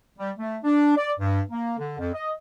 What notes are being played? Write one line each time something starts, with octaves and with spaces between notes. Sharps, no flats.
G3
A3
D4
D5
G2
A#3
D3
F2
D#5